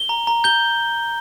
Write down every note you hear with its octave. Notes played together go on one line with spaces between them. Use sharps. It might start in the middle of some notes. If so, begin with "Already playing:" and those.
Already playing: G7
A#5
A#5
G6 G7